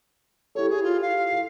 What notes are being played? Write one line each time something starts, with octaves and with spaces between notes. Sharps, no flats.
E4 G4 A4 C#5
G#4
F4
F5